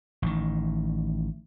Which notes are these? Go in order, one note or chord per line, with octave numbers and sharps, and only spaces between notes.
A1 D#3